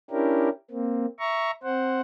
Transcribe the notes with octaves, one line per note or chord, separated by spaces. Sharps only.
C#4 D4 E4 G4 A#4
A#3 C4
E5 A#5 C#6
C4 C5 F#5